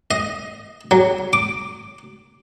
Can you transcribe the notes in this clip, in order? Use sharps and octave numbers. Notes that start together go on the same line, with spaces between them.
D#5
F#3
D6